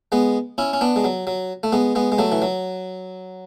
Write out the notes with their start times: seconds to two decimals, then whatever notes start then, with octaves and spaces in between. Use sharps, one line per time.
0.12 G#3 B3
0.58 C#4 E4
0.73 C#4
0.81 B3 D4
0.96 G#3
1.04 F#3
1.27 F#3
1.63 A3
1.72 G#3 B3
1.95 G#3 B3
2.12 G#3
2.18 F#3 A3
2.32 E3
2.42 F#3